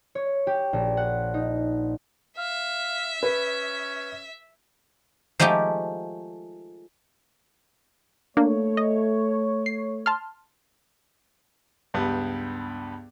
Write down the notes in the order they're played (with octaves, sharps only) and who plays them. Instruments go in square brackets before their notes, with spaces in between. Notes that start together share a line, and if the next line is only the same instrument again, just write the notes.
[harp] C#5
G4
A#1
F#5
D#4
[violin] E5 [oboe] F5
[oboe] C#4 [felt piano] B4
[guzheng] F3 G#3 A3 D#4 G4
[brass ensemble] A3 C#5 [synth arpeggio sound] A#3 D4
[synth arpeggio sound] D#5
C7
A5 C6 F6
[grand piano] C#2 G2 G3 B3